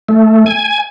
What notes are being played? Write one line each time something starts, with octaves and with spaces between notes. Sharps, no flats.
A3
G#5